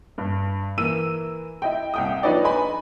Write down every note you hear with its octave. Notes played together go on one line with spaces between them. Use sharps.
G2
E3 A#3 E6 D#7
E4 D#5 G5
C2 G5 D#6
F3 D4 D#4 B4 C#5 D5
B4 D#5 G#5 B5